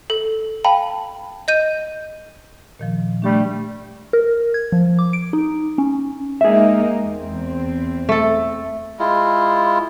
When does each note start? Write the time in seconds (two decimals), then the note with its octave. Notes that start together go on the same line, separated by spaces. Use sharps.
0.10 A4
0.65 F5 G5 A5 B5
1.48 D#5 G6 D#7
2.79 A#2 D#3 F3
3.22 G3 A3 D4 G4
4.13 A#4
4.54 G#6
4.72 F3
4.99 D6
5.13 D7
5.33 D#4
5.78 C#4
6.41 G#3 A#3 D#4 G#4 E5
7.03 E2 C4
8.09 A3 A4
8.99 G#3 E4 F4